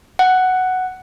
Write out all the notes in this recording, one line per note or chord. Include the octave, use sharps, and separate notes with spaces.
F#5